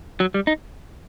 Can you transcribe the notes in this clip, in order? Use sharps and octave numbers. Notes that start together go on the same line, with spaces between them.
F#3
G3
D#4